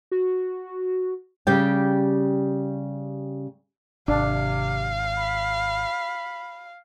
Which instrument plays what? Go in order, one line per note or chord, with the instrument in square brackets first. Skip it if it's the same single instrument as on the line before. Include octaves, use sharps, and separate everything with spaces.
[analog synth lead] F#4
[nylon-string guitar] C#3 G3 G4 G5
[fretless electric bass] G#1 [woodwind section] C3 [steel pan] D4 [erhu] F5
[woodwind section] B5